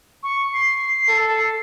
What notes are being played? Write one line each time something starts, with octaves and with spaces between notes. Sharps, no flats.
C#6
C7
A4